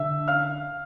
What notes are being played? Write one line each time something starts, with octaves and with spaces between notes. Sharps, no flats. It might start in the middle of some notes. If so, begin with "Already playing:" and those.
Already playing: D3 E5 E6
F5 F6